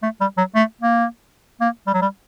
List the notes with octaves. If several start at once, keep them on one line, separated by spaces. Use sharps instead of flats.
A3
G3
F#3
A3
A#3
A#3
G3
F#3
G3